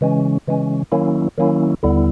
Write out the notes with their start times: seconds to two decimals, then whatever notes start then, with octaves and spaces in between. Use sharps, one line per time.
0.01 C#3 E3 G#3 C#4
0.47 C#3 E3 G#3 C#4
0.92 D#3 F#3 A#3 C#4 E4
1.38 D#3 F#3 A#3 C#4 E4
1.83 D#2 D3 G3 B3 E4